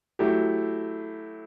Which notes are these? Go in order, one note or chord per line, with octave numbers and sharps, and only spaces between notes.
F#3 A3 E4 G4